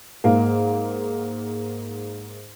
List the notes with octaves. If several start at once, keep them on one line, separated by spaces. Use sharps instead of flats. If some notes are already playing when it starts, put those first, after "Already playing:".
G#2 A#3